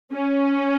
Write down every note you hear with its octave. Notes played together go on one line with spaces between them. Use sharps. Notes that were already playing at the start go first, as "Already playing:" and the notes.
C#4